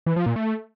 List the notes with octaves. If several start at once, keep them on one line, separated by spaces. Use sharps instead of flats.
E3
F3
A#2
A3